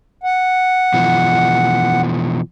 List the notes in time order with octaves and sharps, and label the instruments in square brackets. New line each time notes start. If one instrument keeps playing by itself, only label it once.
[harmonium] F#5
[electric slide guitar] B2 E3 F3